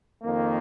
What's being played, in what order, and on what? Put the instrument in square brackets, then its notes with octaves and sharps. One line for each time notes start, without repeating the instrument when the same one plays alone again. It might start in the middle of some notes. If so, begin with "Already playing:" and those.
[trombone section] F2 D#3 A#3